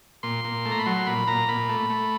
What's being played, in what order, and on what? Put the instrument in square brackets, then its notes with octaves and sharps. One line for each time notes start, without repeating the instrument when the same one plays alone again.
[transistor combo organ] A#2 C6
A#2
A3
A#5
B5
F#3 C6
A#2 B5
A#2 A#5
A#2 B5
A3
A3